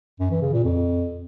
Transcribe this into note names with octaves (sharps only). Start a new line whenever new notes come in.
F#2
E3
C#3
A#2
F2